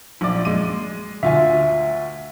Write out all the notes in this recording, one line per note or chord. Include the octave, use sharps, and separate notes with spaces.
A#1 D5
G#3 D#7
D2 F4 E5 G#5